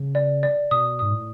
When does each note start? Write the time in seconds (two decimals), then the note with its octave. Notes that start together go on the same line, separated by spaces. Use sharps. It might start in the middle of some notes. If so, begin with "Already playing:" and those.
Already playing: C#3
0.15 D5
0.43 D5
0.71 B2 D#6
0.99 G#2 D#6
1.13 A2